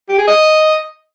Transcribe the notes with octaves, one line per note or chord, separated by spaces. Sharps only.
G4
G#4
D#5